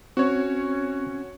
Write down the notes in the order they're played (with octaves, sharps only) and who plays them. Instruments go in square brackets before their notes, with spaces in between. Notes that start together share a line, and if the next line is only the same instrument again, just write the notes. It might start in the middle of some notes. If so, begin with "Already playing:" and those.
[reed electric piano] C4 [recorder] C#4 [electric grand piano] F#4 C#5